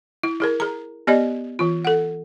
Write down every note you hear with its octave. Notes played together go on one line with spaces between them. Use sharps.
E4
E4 G#4 A#4
G#4 A#5
B3 G4 D5 D#5
E3 F4
A4 F#5